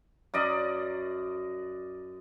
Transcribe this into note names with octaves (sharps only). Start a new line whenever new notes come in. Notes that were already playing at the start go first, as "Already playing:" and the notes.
F#2 D5 D#5